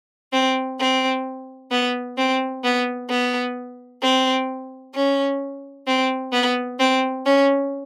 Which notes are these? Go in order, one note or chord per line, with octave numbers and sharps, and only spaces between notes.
C4
C4
B3
C4
B3
B3
C4
C#4
C4
B3
C4
C#4